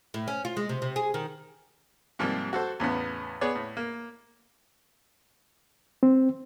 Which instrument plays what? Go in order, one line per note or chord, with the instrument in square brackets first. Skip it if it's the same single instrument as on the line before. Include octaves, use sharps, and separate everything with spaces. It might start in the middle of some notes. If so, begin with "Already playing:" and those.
[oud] A2
C#4
F4
G#3
C3
C3
G#4
D#3
[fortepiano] G#2 C3 F3 G3 A#3
F#4 A4 C5
E2 A2 C#3 B3
B3 G#4 C#5 D5
A2
A#3
[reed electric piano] C4